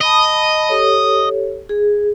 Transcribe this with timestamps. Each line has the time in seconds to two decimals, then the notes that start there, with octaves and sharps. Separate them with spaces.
0.01 D#5 A5 B5 D#6
0.69 G4 A4 C#5
1.69 G#4